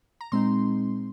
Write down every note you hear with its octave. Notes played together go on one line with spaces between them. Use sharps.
A#5
A#2 G#3 C4 D#4 C6